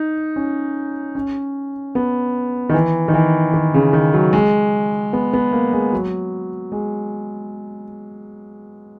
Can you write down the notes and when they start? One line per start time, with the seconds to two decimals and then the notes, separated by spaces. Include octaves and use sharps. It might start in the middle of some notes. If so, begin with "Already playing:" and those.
Already playing: D#4
0.36 C#4
1.15 C#4
1.95 B3
2.69 D#3
2.74 E3
3.08 D#3
3.14 E3
3.54 D#3
3.74 C#3
3.93 D#3
4.14 F#3
4.33 G#3
5.13 B3
5.33 B3
5.53 A#3
5.73 G#3
5.93 F#3
6.72 G#3